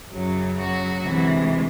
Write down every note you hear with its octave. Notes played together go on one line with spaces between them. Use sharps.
F#2 C#3 F#3
F#3 F#4
D2 C3 E3 G#3